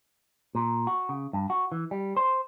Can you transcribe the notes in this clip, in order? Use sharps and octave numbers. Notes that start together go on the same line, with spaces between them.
A#2
F#4
C#3
G2
F#4
E3
G3
C5